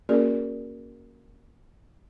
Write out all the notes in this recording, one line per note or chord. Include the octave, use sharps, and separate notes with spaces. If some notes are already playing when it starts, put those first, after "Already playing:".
A#3 C#4 F#4 G#4 A#4 D5